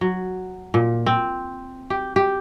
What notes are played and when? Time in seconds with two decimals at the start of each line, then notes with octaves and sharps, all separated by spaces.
0.01 F#3
0.74 A#2
1.06 C4
1.90 G4
2.16 G4